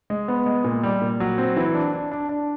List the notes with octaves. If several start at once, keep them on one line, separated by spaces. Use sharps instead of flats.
G#3
B3
G#3
A#2
G3
A#2
F#3
C4
E3
D4
D4
D4
D4